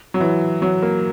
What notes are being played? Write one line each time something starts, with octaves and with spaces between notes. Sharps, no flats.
F#3
E3
F#3
A#3